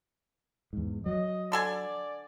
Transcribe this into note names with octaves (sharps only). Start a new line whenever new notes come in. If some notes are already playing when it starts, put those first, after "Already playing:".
E2 G#2
F#3 D#5
D3 A4 D5 G#5